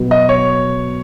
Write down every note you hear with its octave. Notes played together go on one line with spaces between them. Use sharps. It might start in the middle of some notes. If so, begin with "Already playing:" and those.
Already playing: B2 F#3 B3
D#5
C#5